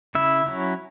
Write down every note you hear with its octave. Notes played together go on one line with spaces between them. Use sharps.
C#3 E4 E5
F#3 C#4 E4